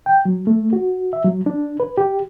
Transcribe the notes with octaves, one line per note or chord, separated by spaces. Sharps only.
G5
F#3
A3
F#4
E5
F#3
D4
B4
G4